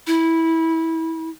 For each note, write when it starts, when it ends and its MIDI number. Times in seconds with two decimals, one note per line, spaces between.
0.07 1.29 64